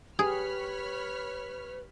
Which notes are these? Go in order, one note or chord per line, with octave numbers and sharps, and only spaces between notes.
G4 G#4 B4 C#5 B5 F6